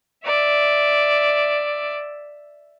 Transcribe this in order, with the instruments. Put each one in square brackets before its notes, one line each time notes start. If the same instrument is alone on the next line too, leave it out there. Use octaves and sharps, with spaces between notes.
[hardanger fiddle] D5 E5